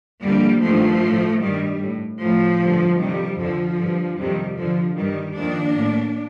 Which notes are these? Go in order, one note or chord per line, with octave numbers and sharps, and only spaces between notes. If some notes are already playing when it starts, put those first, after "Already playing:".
F2 D3 G3 A#3
G2 D#3 F3 A3
A2
G2 D#3 G3
A2
A2 F3 A3
G2 D3
F2 C3 D#3 G3
F2 D3 F3
G2 D3
F2 C3 D#3 G3
F2 D3 F3
G2 D#3 G3
F2 D#3 A#3 D4
A2